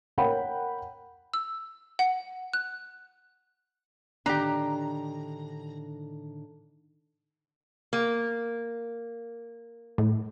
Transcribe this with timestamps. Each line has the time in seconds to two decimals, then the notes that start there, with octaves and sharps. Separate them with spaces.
0.18 A#4 C#5 F#5 G5 B5
1.34 E6
1.99 F#5
2.53 F#6
4.26 A2 D3 D#3 D4 G4 A#5
7.93 A#3
9.98 A2